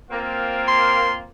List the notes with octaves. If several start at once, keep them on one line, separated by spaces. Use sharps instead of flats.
A#3 C4 F4
C6